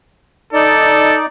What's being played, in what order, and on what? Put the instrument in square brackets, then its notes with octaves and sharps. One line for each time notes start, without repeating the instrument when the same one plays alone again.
[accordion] D#4 D5 [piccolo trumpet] A4